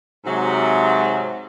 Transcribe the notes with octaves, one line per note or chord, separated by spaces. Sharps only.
G#2 C3 F#3